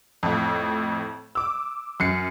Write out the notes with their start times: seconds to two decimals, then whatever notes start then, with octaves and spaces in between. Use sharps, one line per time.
0.23 F2 A2
1.35 D6 E6
2.00 F#2 C7 C#7